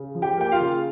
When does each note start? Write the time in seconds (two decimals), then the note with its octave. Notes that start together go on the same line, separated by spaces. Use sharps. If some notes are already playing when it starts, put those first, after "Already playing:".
Already playing: C#3
0.15 F3
0.22 G4 G5
0.37 A#3 G5
0.52 F4 F5
0.60 C#3